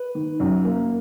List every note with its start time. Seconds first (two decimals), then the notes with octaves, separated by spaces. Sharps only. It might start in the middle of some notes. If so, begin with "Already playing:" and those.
Already playing: B4
0.15 D#3
0.40 F#2
0.65 A#3